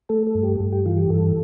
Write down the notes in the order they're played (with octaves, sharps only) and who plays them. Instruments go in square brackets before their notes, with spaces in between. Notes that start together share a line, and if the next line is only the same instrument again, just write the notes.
[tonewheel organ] A3 A4
A4
G2
G4
G2
G4
E3 F4
G4
G2 A4